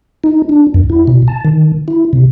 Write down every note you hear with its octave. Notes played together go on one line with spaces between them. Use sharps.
D#4
D4
F2
E4
B2
A5
D#3
E4
C3